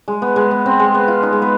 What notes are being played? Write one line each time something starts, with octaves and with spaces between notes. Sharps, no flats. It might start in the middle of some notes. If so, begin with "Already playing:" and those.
G#3
B3
G#3
B3
C4
G#3
B3
F4
D#4
G#3
B3